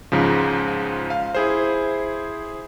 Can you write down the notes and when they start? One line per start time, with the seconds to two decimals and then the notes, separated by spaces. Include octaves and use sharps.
0.12 C#2 G#2 C#3 F3
1.10 F5
1.35 E4 G#4 C5